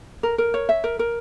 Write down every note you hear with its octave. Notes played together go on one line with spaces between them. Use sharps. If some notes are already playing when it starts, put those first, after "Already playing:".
A#4
A#4
C#5
E5
A#4
A#4